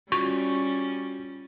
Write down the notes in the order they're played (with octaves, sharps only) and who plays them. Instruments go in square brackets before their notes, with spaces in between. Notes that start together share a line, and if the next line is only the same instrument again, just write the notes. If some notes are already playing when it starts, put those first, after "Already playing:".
[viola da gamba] G3 C#4 [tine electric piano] F4 F#4 [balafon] C#6